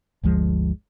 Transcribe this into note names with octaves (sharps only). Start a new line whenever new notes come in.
G1 D2 F3 G#3